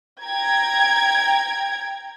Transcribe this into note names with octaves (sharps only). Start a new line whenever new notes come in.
G5 A#5 G#6